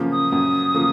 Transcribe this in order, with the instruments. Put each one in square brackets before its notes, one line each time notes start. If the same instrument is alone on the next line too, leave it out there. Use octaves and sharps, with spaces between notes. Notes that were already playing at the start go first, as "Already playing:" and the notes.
Already playing: [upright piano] F#2 C#3 F3 A#3
[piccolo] D#6
[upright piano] F#2
C#3 F3 A#3